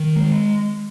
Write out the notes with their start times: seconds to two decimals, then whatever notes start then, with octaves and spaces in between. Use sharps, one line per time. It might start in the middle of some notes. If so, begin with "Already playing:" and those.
Already playing: D#3
0.16 G#3